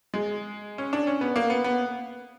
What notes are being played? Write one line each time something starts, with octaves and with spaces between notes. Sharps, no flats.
G#3
C#4
D4
C#4
B3
A#3
B3
B3